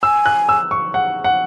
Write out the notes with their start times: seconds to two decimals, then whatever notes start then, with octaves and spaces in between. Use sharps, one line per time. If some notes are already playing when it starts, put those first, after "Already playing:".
0.03 G#5 E6
0.26 F#6
0.49 E6
0.71 C#6
0.94 F#5
1.24 F#5